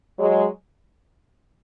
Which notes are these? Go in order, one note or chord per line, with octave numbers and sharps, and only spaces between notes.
F#3 G#3